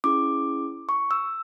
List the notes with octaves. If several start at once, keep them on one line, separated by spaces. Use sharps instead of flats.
C#4 E4 G#4 D6
C#6
E6